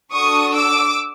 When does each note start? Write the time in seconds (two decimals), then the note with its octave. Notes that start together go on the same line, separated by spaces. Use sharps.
0.12 D4 F#4 A4 C#6 D#6
0.54 D6 E6